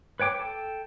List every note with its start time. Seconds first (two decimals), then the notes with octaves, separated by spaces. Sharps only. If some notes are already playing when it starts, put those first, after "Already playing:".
0.20 B4 C#5 G5 D6
0.39 A4 G5